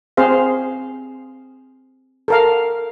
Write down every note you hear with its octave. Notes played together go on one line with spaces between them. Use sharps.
C4 G#4 C5 F5
A4 A#4 F5